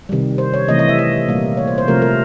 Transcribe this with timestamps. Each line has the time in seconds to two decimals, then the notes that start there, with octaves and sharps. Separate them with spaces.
0.09 C3 D#3 G3
0.38 C5
0.54 C#5
0.68 C3 E3 A3 D#5
0.79 D#5
0.89 E5
0.99 D#5
1.28 A#2 G3 A#3
1.57 C#5
1.67 C5
1.78 C5
1.88 C3 F3 A3 A#4
2.02 A#4